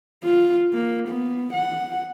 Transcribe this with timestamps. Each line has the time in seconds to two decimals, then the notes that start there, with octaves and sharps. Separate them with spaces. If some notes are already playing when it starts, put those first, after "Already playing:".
0.25 F4
0.74 A#3
1.08 B3
1.54 F#5